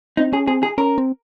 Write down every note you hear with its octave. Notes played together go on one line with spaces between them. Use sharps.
C4 D#4
C#4 G#4
C4 G#4
G#4
C#4 A#4
C4